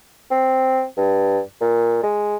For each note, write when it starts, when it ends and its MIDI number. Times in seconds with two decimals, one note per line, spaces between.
0.31 0.84 60
0.97 1.40 43
1.61 2.01 46
2.03 2.36 56